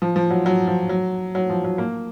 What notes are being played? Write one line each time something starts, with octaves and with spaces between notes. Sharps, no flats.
F3
F3
F#3
F#3
F3
F#3
F#3
F3
F#3
A#3